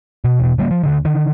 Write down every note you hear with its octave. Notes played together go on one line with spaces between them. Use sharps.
B2
E1 B2
D3 G3 G#3 A#3
F3
D2 D3 D#3
D3 D#3